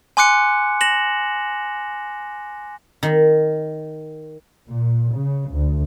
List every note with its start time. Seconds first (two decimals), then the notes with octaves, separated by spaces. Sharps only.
0.17 G#5 C6 D6 F#6 C#7
0.81 A#6 E7 F#7
3.03 D#3
4.68 A#2
5.15 C#3
5.51 D2